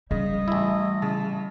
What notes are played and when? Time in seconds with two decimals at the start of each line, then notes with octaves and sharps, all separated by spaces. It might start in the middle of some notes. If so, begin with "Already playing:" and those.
0.11 C#3 G3 D#5
0.48 A1 E4
1.02 C#3 A5